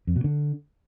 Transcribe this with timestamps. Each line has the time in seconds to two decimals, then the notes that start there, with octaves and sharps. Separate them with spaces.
0.07 F2
0.16 B2
0.24 D3